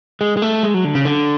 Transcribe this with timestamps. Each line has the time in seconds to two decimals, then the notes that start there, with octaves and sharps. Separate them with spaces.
0.21 G#3
0.37 G#3
0.42 A3
0.63 G#3
0.74 F#3
0.84 D3
0.95 C#3
1.05 D3